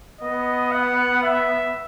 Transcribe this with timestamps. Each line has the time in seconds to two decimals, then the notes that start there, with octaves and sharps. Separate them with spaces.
0.21 B3 D#5
0.72 F#5
1.23 E5